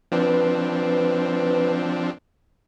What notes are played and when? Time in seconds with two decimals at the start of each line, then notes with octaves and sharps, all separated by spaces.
0.12 F3 C4 D4 B4